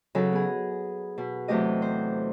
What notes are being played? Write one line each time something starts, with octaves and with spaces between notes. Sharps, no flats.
C#3 F#3 D#4 A4
B3 G#4
B2
E2 C3 F#3 A3 G4 D#5
C5